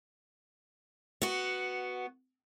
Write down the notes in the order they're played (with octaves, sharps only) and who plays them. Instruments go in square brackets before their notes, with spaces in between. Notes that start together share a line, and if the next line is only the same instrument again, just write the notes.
[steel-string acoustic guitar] B3 F#4